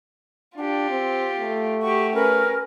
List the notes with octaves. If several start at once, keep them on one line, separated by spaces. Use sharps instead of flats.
D4 F4 G4
C4
A3
F#4 G4 C#6
C#4 A#4 B4